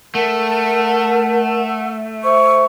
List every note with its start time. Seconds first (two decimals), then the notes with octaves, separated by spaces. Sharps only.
0.15 A3 A#4 F#5 A5
2.24 C5 E5 C#6